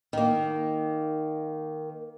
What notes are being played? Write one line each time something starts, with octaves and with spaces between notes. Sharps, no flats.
D#3 A#3